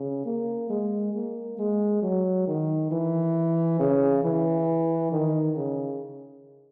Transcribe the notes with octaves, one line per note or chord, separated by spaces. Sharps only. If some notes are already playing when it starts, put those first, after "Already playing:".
Already playing: C#3
A#3
G#3
A#3
G#3
F#3
D#3
E3
C#3
E3
D#3
C#3